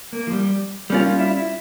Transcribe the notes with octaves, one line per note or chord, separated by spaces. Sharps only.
A#3
F3
G3
G3 A#3 C#4 F4
E4